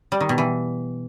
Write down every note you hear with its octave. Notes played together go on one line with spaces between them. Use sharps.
G3
D#3
B2
E3